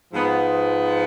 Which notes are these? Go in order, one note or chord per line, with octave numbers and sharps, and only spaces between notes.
G#2 F3 B3